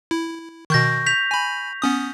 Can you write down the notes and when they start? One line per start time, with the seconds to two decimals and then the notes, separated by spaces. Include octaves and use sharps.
0.11 E4
0.70 B2 D#3 C#6 G6 A#6
1.06 G6 B6 F7
1.31 G#5 B5
1.82 B3 C#4 D#6